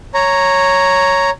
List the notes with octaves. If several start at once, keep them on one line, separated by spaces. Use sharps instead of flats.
C#5 A#5